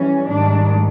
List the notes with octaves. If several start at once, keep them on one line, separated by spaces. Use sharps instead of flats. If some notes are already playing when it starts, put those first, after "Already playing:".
Already playing: E3 G3 C#4
G#2 D#3 G3 D4